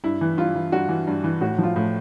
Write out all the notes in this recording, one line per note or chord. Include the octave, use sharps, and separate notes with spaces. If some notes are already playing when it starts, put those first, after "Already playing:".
G2 E4
E3
G2 F4
E3
G2 F#4
E3
G2
E3
A2 F#4
F3 F4
A2